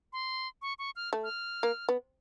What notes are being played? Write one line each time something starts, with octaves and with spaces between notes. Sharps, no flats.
C6
C#6
C#6
F6
A3
F6
A#3
B3